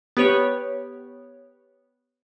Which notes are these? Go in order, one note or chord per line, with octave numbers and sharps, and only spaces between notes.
B3 G4 B4 C#5